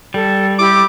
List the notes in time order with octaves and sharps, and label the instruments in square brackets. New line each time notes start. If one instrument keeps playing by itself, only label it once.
[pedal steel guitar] G3 [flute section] A4
[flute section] E4 G4 [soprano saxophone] D6